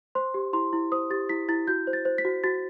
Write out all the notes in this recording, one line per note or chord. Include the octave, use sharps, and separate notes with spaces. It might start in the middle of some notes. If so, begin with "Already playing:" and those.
C5 C6
G4
E4 C6
E4
C5 D#6
G4 A6
E4 B6
E4 A6
F#4 G6
C5
A6
C5
B6
F#4
F#4 A6